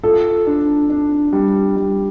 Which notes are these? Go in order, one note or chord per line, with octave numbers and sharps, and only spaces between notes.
F4 A4
D4
D4
G3
G3